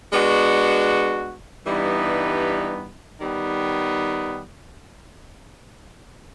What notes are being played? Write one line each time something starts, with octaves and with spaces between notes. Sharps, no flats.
G#3 B3 D4 F#4
G2 E3 G3 B3 D#4
D#3 G3 B3